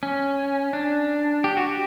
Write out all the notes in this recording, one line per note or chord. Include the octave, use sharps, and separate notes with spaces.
C#4
D4
G4
F#4
G4